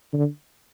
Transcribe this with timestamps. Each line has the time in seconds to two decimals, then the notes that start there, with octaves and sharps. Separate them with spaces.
0.13 D3